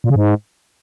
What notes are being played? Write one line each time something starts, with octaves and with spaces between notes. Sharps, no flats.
A#2
C#3
G#2